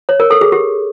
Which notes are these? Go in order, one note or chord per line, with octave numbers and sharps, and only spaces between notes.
C#5
A#4
A4
G#4
G4